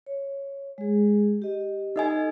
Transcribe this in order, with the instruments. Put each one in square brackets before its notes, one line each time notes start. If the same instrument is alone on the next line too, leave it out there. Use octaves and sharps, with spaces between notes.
[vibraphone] C#5
G#3 G#4
G4 D#5
[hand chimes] D#4 D#5 G#5 [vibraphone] A4